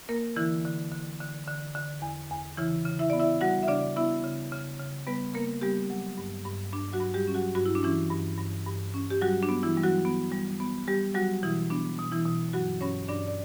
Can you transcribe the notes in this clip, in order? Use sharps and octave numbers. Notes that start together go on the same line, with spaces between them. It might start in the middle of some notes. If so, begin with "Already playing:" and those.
A#3 A#4
D3 E3 E4
D3
D3
D3
D3
D3
E2
E2
C#3 E3 E4
C#3
E4 E5
B3 D5
E4 E5
G3 F#4 F#5
E5
C#3 D4 D5
B3 E4 E5
C#3
C#3
C#3
G3 B3 B4
C#3 A#3 A#4
G3 B3 G4
F#3
G2
G2
G2 D4
F#3 F#4
G2
G3 G4
C#4
F#3 F#4
G2 F#4
E4
D4
E3 C#4 E4
G2
G2
G2
C#4
G4
F#3 G3 F#4
D4
B3
E3 E4
G3
F#3 F#4
B3
G3
B3
G3 G4
F#3 G3 F#4
B2 E3 E4
B3 D4
B2
E3 E4
B2
G2 F#3 F#4
G2 C#4 C#5
G2 D4 D5
D5